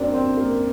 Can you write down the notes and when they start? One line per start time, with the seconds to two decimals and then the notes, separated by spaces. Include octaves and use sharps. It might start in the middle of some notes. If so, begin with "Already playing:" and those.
Already playing: F#2 A#3 C4 D4
0.14 C4
0.37 A#3